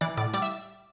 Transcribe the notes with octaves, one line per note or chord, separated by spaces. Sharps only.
E3 D5
A2 D5
G3 D5
E5